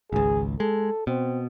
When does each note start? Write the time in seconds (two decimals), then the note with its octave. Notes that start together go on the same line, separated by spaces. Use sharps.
0.13 G#1 C#2 G#4
0.60 G#3 A4
1.07 B2 C4